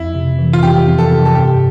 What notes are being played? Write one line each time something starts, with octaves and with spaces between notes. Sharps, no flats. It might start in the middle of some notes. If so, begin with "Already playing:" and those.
Already playing: F2 E4
C3
E3
F4
F2 G4
F2
A4
C3
A4
G2 G4